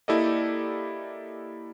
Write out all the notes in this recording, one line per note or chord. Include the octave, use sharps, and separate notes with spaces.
A#3 E4 G4 A4 D5 D#5